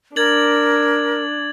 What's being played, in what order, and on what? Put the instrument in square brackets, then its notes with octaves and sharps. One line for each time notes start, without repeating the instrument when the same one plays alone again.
[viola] D4 [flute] A#4 [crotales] G#6 A6 F#7